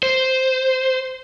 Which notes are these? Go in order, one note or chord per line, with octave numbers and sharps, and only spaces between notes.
C5